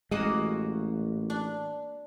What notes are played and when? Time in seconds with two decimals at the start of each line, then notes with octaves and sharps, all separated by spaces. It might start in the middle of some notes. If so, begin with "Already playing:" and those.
0.11 A1 G#3 A#3 F#4 D#6
1.30 D4